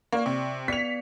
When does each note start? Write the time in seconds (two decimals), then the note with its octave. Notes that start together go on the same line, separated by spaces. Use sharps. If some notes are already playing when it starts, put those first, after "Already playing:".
0.12 A#3 D5 C#6
0.26 C3
0.68 B3 D5 B6 C#7 F7